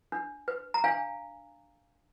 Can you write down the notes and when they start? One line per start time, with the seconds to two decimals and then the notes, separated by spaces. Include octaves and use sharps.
0.12 D4
0.48 B4
0.74 A#5
0.84 D4 F5 G#5